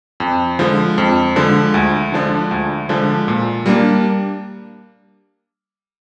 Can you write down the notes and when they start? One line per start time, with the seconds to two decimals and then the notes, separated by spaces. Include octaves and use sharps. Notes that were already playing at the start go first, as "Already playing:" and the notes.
0.20 F2
0.59 D3 F3 G#3
0.98 F2
1.36 D3 F3 G#3
1.74 D2
2.12 D3 F3 G#3 D4
2.51 D2
2.89 D3 F3 G#3 D4
3.28 A#2
3.66 G3 A#3 D4